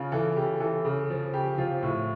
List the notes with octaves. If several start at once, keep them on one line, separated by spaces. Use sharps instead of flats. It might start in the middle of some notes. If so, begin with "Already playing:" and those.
Already playing: C#3 F4
E3 A4
C#3 G4
E3 A4
C#3
F3
C#3 G4
F3 F4
A2